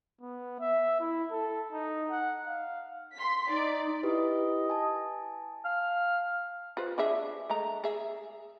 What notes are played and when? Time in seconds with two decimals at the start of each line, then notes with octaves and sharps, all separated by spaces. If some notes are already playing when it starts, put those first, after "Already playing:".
0.21 B3
0.60 E5
1.00 E4
1.31 A4
1.73 D#4
2.10 F#5
2.47 F5
3.15 C6 B6
3.49 D#4 D5
4.03 E4 G4 B4 D#5
4.70 G#5 A5
5.65 F5
6.77 F4 B4 C5
6.98 D4 G#4 E5
7.50 G#3 A3 A#5
7.84 G#4 E5